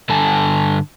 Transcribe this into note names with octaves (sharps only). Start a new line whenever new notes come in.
G2 D3 A4 G#5 A5